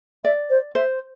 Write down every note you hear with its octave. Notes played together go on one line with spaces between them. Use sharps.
D5 E5
C5
C5 E5